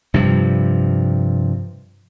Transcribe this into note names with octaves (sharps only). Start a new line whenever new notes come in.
G2 C3 F3